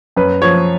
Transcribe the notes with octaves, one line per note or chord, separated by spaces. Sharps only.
F#2 B4
F3 C#5